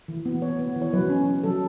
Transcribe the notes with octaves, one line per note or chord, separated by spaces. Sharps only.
E3
B3
B3 C#5
B3
E3
C#5
F#3 B4
C#4
C#4
F#3 A4